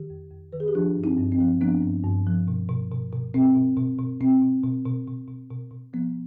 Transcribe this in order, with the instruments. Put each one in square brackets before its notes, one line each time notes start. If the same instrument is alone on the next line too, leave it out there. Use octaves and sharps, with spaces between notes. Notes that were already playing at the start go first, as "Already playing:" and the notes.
Already playing: [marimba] D#3 G4
F2
F2
D#3 B4
G#4
G4
F3 D4 F4
G2
C4 D#4
G2
C4
F3
F3 B3 D4
G2
G2
F3
B2
B2
B2
B2
B2 C4
B2
B2
B2
B2 C4
B2
B2
B2
B2
B2
B2
B2
F3 B3